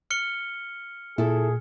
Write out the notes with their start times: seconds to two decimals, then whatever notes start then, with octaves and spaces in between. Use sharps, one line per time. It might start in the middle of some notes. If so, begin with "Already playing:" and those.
0.10 F6 C#7 G7
1.18 A#2 E4 G#4 A4